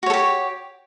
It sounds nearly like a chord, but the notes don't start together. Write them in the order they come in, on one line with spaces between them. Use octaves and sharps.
F#4 C#5 A4 G4